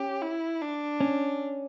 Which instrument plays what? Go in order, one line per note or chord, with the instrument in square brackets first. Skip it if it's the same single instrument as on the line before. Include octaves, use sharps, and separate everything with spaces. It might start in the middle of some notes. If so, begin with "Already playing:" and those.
Already playing: [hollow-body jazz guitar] C#4 [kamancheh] G4
[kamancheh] E4
D4
[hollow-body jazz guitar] C#4